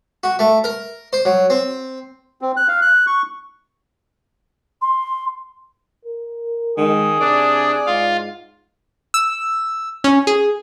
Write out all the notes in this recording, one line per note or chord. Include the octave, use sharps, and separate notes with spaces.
F#4
A3
A#4
C5
F#3
C4
C4
F#6
F5
F#6
C#6
C6
A#4
D#3 G#3 G#4
C3 D4 D5
G#2 F4 F5
E6
C#4
G#4